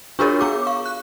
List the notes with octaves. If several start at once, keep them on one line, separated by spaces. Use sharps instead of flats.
D4 F4 F#4 G#4 A#4 C#5
B3 G#4 D6
F5 C#6
F#6